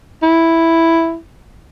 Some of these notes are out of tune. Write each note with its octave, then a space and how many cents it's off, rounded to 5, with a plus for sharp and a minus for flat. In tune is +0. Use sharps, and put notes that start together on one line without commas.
E4 +0